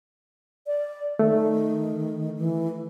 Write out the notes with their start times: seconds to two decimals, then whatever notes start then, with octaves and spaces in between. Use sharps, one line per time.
0.67 D5
1.19 D#3 A3
2.37 E3